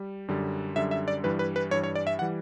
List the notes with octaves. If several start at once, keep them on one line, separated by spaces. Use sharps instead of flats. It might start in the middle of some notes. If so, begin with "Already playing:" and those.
Already playing: G3
F#2 D3 G3
F#2 D3 G3 E5
E5
D5
G2 E3 G3 B4
B4
B4
G2 E3 G3 C#5
C#5
D5
E5
F#5
E3 G3